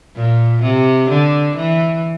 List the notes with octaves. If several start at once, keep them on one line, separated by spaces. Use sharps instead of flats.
A#2
C3
D3
E3